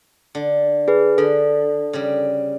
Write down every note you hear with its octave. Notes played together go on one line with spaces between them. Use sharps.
D3
G#4 B4
D3 A4
C#3 G3